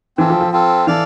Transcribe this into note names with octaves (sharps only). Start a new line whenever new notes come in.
E3 C4 F4 A4
F3
F3
C4 F4 A4
E3 A4 D5 F5